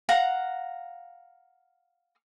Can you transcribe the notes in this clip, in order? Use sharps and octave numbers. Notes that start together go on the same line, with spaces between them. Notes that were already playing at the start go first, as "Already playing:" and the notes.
F5 F#5 A#5